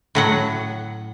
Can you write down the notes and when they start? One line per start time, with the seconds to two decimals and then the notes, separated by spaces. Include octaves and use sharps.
0.15 A2 F#3 F#5